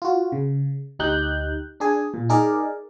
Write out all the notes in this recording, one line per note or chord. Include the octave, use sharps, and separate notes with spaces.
F4 F#4
C#3
D2 D#4 G4 F#6 G6
D4 G#4 G#5
A#2
D#4 G#4 A#4 D5